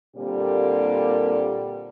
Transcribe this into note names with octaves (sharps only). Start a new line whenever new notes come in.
A#2 D3 G3 A#3 C4 G4